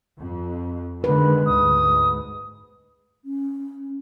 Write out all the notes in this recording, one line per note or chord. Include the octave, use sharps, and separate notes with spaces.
F2
D3 D#3 G#3 B4
D2 G#2 D#6
C#4